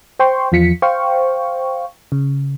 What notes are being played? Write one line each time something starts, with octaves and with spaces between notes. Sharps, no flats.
C5 G5 C6 C#6
E2 F3 F4 B6 C#7
C5 F5 G5 C#6
C#3